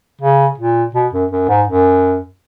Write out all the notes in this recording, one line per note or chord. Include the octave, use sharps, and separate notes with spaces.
C#3
A#2
B2
F#2
F#2
G#2
F#2